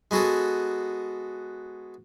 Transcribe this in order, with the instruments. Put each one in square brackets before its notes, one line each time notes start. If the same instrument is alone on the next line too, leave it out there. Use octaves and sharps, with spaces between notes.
[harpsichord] G#3 B3 F#4 G#4 A4